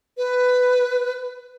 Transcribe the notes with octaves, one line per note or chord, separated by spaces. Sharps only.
B4